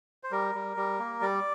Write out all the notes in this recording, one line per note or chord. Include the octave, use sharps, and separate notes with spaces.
C5
G3 A#4
G3
G3
A#3
G3 D5